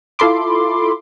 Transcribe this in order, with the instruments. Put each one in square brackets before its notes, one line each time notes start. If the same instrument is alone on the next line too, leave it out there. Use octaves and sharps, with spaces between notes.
[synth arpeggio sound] E4 F4 A4 B5 C6 D6